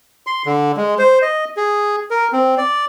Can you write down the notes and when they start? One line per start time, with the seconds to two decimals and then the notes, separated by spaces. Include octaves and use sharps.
0.27 C6
0.46 D3
0.77 G#3
0.98 C5
1.22 D#5
1.57 G#4
2.11 A#4
2.33 C4
2.58 D5